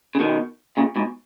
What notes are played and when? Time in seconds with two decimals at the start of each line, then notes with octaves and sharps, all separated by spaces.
0.15 C#3
0.20 B2 D#3
0.77 A#2 C#3
0.96 G#2 B2